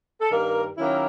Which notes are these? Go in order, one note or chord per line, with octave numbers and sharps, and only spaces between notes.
A4
G2 D#3 G3 A#3 A#4
D#3 F#3 A#3 C#4 E4